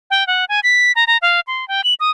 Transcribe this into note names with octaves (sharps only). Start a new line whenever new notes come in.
G5
F#5
G#5
B6
A#5
A#5
F5
C6
G5
F#7
D#6